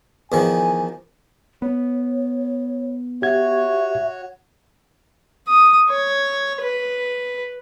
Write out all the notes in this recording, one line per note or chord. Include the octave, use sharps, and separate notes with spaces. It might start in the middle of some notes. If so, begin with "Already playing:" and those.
E2 D#3 F3 G#5
B3 C#5
F#4 G4 C#5 E5 G#6
D#6
C#5
B4